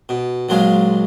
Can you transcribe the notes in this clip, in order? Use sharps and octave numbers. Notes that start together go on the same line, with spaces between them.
B2
A#1 F#3 G#3 F4